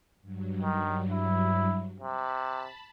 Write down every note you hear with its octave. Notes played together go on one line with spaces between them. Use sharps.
G2 F#3
D#3
E4
C3 A5 B5